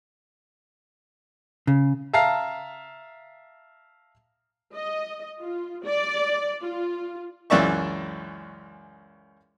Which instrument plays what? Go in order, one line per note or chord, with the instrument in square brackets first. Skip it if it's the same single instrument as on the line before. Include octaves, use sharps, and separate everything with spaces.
[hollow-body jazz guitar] C#3
[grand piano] E5 F5 A5 A#5 F6 C7
[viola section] D#5
F4
D5
F4
[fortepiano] C#2 F#2 E3 D5 E5 C#6